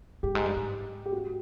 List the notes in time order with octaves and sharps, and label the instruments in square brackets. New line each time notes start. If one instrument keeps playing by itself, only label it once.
[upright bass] G2 [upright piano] G4
[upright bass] G#2
G2
G#2
[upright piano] G4
F#4